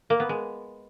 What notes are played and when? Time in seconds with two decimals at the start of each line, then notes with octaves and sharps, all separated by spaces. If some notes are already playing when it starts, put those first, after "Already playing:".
0.10 A#3
0.20 B3
0.29 G#3